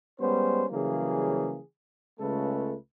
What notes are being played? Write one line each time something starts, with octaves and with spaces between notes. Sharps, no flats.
G3 G#3 B3 C#4 C5
C#3 E3 F#3 G3 A#3 G#4
C#2 C#3 G#3 A3 A4 B4